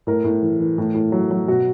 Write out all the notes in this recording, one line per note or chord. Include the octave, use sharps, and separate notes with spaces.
A2 A#4
A2
E3
E3
A2
A2
F#3
F#3
B2 F#4